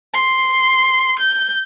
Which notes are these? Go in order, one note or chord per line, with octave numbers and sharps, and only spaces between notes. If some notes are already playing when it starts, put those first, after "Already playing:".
C6
G6